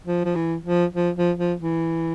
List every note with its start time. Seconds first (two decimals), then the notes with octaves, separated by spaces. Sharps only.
0.06 F3
0.25 F3
0.35 E3
0.65 F3
0.95 F3
1.16 F3
1.38 F3
1.60 E3